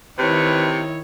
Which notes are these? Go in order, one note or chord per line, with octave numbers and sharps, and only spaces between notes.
C3 D#3 E4 B4 C#5